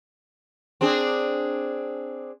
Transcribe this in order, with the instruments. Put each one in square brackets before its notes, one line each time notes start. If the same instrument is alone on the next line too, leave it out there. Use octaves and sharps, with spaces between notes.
[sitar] C4 D4 G#4